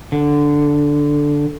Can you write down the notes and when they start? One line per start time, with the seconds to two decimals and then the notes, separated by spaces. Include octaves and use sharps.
0.12 D3